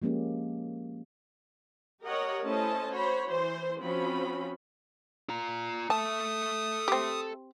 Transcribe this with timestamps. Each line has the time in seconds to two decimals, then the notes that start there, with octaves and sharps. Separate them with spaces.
0.02 F3 G#3 A#3 C#4 G4
2.03 G4 A#4 C#5 D#5 F#5
2.44 A3 C#4 E4 C5 D#5 A5
2.90 F#4 C5 C#5 B5
3.27 E3 C5 C6
3.81 F3 C4 C#4 F#4 B5
5.29 F4 A#5
5.90 A4 E5 A5 D#6
6.88 C4 G4